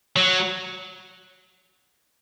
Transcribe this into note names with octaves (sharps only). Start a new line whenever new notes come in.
F#3